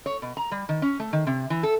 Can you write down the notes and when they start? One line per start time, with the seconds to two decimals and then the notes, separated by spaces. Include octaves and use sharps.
0.06 C#5
0.22 B2
0.37 A#5
0.51 G3
0.69 D#3
0.82 C#4
1.00 A3
1.13 D#3
1.27 C3
1.50 E3
1.63 A4